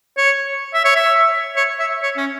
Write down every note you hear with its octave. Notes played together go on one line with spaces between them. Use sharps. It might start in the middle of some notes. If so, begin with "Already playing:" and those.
C#5
E5
C#5
E5
C#5
E5
C#5
C#4